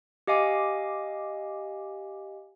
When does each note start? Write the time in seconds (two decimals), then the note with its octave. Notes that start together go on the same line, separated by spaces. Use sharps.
0.27 G4 D#5 F5 G#5 D6